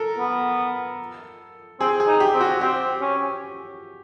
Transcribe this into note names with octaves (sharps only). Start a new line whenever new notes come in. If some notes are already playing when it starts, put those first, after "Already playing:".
Already playing: A4 A#4
B3
C4 G#4
G#4
D#4
G4
C4
F#4
C4 G4
C#4